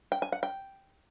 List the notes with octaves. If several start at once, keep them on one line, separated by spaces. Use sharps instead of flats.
G5
G#5
F#5
G5